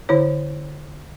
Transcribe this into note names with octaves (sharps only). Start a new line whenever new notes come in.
D3 E4 C#5